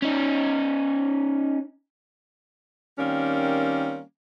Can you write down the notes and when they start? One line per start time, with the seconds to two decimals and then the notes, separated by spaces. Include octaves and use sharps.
0.02 C#4 D#4
2.99 D#3 G3 A#3 C4 C#4